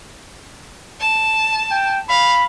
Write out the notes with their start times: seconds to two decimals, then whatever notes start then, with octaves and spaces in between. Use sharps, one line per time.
1.01 A5
1.71 G5
2.09 F5 B5